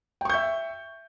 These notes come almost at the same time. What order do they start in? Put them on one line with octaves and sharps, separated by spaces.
G5 C#6 G6 E5